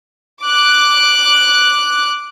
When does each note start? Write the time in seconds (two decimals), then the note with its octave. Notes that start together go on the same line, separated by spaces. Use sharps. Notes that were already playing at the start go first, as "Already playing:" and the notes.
0.42 D6 F#6